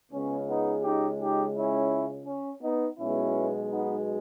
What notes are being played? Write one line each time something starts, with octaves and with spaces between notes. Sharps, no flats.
C#2 C#3 G#3 B3 C#4
B3 D#4
D#4 G4
D#4 G4
C#4 E4
C#4
B3 D#4
B1 B2 G#3 B3 C#4 E4
B3 D#4